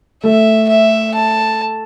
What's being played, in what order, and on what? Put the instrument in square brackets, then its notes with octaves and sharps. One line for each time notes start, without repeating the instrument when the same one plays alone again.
[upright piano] A3 [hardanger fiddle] E5
[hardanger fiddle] E5
A5